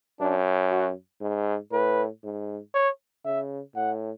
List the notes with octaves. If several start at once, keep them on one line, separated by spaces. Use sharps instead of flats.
F#2 D4
F#4
G#2
A2 B4
G#2
C#5
C#3 E5
A2 F#5